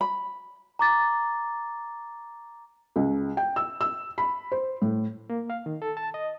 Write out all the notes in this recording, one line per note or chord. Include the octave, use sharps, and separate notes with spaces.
B5
A#5 D6 A6
C#2
G5
E6
E6
B5
C5
A2
A#3
F5
D#3
A4
A5
D#5